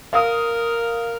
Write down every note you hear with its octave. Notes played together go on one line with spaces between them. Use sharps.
A#4 F5 D#6